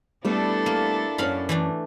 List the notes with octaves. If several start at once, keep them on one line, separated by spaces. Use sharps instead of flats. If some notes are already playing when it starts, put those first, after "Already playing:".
G3 A3 B3 D4 E4 A4
A#3
F#2 C#4 C#5 D5 F5 B5
E3 A3 D4